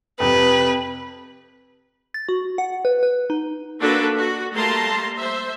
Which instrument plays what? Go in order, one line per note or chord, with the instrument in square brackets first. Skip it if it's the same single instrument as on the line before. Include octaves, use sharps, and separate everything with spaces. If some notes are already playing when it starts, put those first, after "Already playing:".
[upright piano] F2 C3 [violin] B4
[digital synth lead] A6
F#4
F#5
B4
B4
D#4
[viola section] A#3 D4 F#4 A4 B4
F#4
G3 A3 A#3 A5 A#5 C6
C5 E5